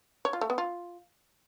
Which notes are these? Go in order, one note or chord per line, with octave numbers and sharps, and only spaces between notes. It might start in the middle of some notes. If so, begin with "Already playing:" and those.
C#5
F4
A3
B3
F4